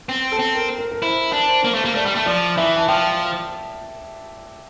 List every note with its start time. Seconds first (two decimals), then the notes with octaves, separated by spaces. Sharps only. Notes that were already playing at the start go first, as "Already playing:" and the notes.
0.09 C4
0.32 A4
0.39 C4
0.55 A#4
0.78 A#4
0.91 A#4
1.02 E4 C5
1.33 D4
1.48 C5
1.64 A#3
1.74 A3
1.85 A#3
1.95 A3 D5
2.06 G3
2.15 A3
2.26 F3 D5
2.57 E3 E5
2.77 A5
2.88 F3 G5